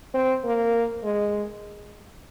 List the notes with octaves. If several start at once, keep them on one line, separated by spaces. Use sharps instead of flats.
C4
A#3
G#3